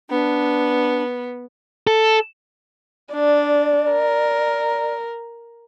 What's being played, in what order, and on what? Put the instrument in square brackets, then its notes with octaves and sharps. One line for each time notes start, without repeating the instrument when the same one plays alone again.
[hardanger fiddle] B3 [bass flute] D4
[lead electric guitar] A4
[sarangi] D4 [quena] D5
[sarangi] A#4